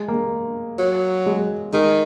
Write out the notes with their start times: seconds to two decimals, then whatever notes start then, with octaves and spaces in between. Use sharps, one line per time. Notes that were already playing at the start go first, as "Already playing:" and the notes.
Already playing: G#3
0.08 A#3
0.78 F#3
1.26 G#3
1.73 D#3 G#3